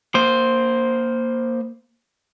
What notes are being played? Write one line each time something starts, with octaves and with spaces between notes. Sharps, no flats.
A#3 C5